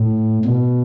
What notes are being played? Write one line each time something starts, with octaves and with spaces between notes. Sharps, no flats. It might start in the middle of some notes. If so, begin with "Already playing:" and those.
Already playing: A2
B2